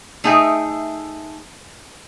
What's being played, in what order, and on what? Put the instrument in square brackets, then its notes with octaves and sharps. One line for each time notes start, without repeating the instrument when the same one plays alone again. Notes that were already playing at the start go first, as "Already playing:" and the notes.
[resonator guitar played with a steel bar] A3 D#4 G#4 E5 G5